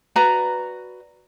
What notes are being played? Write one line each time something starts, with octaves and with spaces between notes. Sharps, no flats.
F#4 B4 D5 A#5